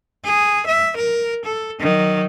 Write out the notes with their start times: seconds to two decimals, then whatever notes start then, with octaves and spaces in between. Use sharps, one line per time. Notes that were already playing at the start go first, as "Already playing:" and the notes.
0.24 G#4
0.67 E5
0.97 A#4
1.45 A4
1.80 D#3 F#3